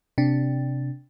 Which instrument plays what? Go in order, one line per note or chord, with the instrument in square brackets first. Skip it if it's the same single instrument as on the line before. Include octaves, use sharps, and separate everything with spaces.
[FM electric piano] C3 D4